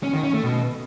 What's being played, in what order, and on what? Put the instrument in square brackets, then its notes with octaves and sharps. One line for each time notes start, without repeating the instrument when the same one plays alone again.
[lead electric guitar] C#4
D#3
C#4
A3
B2